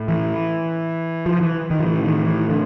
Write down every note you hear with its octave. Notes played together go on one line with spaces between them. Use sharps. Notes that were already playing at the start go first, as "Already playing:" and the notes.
Already playing: A2
E3
F3
E3
D#3
F3
A2 E3
D#3
E3
D3